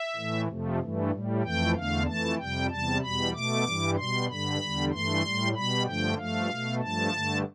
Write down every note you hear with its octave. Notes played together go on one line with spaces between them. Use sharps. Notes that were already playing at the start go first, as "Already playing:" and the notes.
Already playing: E5
A2 E3 A3
F2 C3 F3 A3
G2 E3 A3
A2 G3
F2 E3 A3 G5
E2 D3 A3 F5
F2 E3 A3 A5
F2 C3 G3 G5
E2 C3 G3 A5
E2 B2 G3 B5
B2 A3 D6
G2 E3 G3
B2 G3 C6
G2 D3 G3 B5
E2 D3 G3
G2 E3 A3 C6
A2 G3
B2 G3 B5
G2 D3 F3 A3 G5
G2 F3 A3 F5
B2 A3
G2 F3 A3 A5
G2 D3 A3